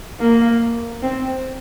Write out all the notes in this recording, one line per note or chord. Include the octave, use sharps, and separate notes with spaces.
A#3
C4